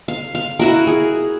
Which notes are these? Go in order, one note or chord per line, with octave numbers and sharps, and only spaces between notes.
F5
F5
E4 F#4 A#4
G#4